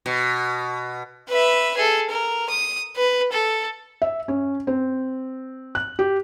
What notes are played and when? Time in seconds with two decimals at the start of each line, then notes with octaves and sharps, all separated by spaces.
0.06 B2
1.29 B4 E5
1.77 G#4 A4
2.10 A#4
2.50 D#6
2.96 B4
3.33 A4
4.02 E5
4.28 C#4
4.67 C4
5.75 F#6
5.99 G4